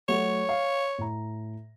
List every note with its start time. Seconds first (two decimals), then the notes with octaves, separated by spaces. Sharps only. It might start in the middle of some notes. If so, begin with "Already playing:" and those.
0.08 F#3 A3 F#4 C#5
0.49 F5
0.98 A2 A#5